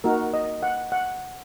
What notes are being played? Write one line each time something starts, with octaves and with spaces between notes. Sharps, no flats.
A#3 D#4 F#4 A#4
D#5
F#5
F#5